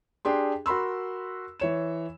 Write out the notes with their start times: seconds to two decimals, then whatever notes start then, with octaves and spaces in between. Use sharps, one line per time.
0.25 D4 G4 G#4 C6
0.66 F#4 A#4 B5 C6 E6
1.60 E3 C#5 E7